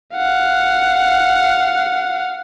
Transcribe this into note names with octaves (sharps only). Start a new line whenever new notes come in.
F5 F#5